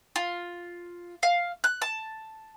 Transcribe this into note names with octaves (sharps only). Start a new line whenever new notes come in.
F4
F5
F#6
A5